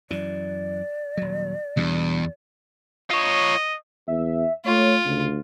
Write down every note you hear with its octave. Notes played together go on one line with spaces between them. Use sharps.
F#2 E3 D5
D#1 F#3
E2 B2 G3 D4
F4 C#5 D#5
E2 E5
A3 F4 C#5
D2 C#3